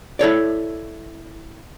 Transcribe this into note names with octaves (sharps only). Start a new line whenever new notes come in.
E4 A4 C#5 D5